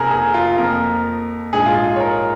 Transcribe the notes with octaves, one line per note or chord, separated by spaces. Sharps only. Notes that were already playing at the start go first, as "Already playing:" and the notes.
Already playing: F1 F2 F3 A#3 G#4 A#4
G#4
F4
F2 F3 A#3 A#4
A#1 G#2 G#3 G#4
F4
G#4
C#5
A#4